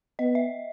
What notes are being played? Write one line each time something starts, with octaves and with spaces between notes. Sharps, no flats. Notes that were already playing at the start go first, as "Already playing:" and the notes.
B3 D#5
E5